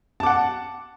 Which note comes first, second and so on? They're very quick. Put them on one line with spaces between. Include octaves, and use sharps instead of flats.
A5 D6 F#5